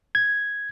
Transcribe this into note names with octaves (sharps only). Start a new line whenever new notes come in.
G#6